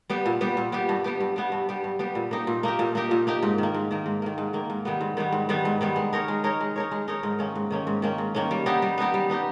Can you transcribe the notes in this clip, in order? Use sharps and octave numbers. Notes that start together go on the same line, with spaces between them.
G3 B3 G4
A#2
G3 B3 G4
A#2
G3 B3 G4
G2
G3 B3 G4
G2
G3 B3 G4
G2
G3 B3 G4
G2
G3 B3 G4
A#2
A#3 D#4 G4
A#2
A#3 D#4 G4
A#2
A#3 D#4 G4
A#2
A#3 D#4 G4
G#2
D#3 A#3
G#2
D#3 A#3
G#2
D#3 A#3
G#2
D#3 A#3
G#2
D#3 G3 B3
G#2
D#3 G3 B3
G#2
D#3 G3 B3
G#2
D#3 G3 B3
G#3
D#4 A#4 C#5
G#3
D#4 A#4 C#5
G#3
D#4 A#4 C#5
G#3
D#4 A#4 C#5
G#2
D#3 A#3 C#4
G#2
D#3 A#3 C#4
G#2
D#3 A#3 C#4
G#2
D#3 A#3 C#4
G3
B3 D#4 G4
G3
B3 D#4 G4
G3
B3 D#4 G4